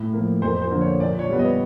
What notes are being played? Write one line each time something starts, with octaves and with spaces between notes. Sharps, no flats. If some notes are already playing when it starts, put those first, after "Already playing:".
Already playing: A2
F3 A#3
F2 C5
C5
D3 F3 A#3
C#5
A#2 D5
C#5
G3 B3
D#5